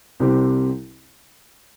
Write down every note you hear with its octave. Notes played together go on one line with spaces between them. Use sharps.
C2 C3 G3 C4 G4